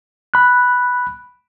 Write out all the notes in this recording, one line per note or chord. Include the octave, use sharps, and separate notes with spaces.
B5 F#6